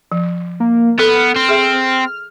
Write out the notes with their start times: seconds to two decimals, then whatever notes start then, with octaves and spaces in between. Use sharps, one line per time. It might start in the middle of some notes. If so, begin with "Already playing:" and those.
0.12 F3
0.60 A#3
0.99 B3 A4 F6
1.36 C4
1.49 G#4 E5